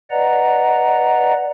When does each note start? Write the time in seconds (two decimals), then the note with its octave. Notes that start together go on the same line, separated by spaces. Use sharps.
0.11 B4 D5 D#5 F#5 A#5